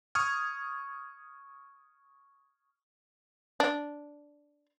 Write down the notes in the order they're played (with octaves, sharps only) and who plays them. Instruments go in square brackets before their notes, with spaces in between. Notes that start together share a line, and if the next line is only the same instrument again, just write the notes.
[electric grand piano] C#6 D#6 F6 G#6
[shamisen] D4